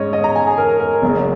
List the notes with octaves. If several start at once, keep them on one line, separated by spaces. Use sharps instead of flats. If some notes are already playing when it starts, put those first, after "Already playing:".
Already playing: G#2 G#3 C#4 C#5 D#5
D#5
A#5
G#5
G#4
A#4
A#4
F#1 F#2 C#3